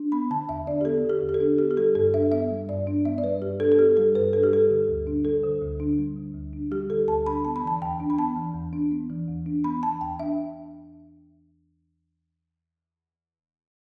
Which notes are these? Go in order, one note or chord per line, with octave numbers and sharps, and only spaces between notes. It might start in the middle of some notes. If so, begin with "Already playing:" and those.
Already playing: D4
B3 B5
D3 A5
E2 E5
D4 D5
G4
B3 A4
D3
G4
E2
G4
A4
D4
B3 G4
G4
G3 A4
G2 A4
D4 E5
B3 E5
G3
G2 D5
D4
B3 E5
D5
G3 B4
G2 G4
D4 A4
A4
B3 G4
G3 A4
G2 B4
D4 A4
G4
G3 A4
D3
D2
D4
G3 A4
D3
D2
D4
G3
D3
D2
D4
G3 G4
D3 A4
D2 A5
D4 B5
B3 A5
B5
E3 A5
E2 G5
D4
B5
B3 A5
E3
E2
D4
B3
E3
E2
D4
B3 B5
E3 A5
E2 G5
D4 E5